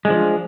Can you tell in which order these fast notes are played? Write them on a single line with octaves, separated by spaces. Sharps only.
G#3 D4 F3